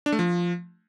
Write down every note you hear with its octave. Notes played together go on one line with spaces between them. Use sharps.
D4
A3
F3